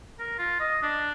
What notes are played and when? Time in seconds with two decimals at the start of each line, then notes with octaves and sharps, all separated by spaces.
0.19 A#4
0.38 F4
0.60 D#5
0.82 D4